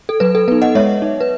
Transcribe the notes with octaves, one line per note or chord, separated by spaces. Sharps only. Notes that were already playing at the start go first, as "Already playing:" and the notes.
A4
F#3 B4
A4
B3 D#4 B4
D#5 F#5
G#3 C#5 E5
D#4
B4